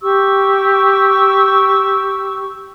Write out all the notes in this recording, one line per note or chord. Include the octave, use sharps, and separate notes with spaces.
G4 C#6 E6